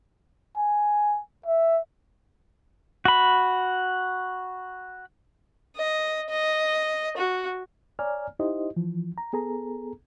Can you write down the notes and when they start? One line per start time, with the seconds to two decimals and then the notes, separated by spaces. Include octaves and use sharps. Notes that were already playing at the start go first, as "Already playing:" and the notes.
0.57 G#5
1.46 E5
3.05 F#4 B5
5.77 D#5
6.29 D#5
7.17 F#4
7.99 C#5 D5 G#5 A#5 F6
8.39 D#4 E4 G4 C5 D#5
8.76 E3 F3
9.18 A#5
9.33 B3 G#4 A4 A#5